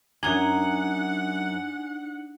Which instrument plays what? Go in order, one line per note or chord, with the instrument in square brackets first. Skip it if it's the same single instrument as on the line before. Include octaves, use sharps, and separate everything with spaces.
[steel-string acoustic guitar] F#2 A#5 [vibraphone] D4 D#4 [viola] F#5 [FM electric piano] G#5